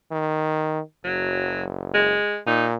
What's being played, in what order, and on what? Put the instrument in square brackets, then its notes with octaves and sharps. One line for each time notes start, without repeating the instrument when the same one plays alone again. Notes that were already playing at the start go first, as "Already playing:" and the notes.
[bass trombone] D#3
[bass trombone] F#1 [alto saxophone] F#3
[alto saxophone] G#3
[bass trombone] A#2 [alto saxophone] D#4